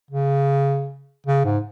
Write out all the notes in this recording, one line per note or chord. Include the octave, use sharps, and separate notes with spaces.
C#3
C#3
G#2